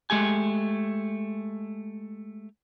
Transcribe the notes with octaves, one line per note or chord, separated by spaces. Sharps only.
G#3 A3 G4 G#5